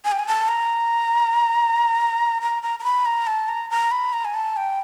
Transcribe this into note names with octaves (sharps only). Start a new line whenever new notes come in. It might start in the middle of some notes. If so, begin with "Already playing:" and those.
G#5
G5
G#5
A5
A#5
A#5
A#5
A#5
B5
A#5
A5
A#5
A#5
B5
A#5
G#5
A5
G5